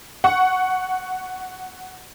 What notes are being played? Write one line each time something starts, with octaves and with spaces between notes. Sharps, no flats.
F#5 C#6